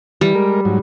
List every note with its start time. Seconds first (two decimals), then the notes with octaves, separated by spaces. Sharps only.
0.21 E3 G3
0.35 G#3 A#4
0.65 G#2 F#3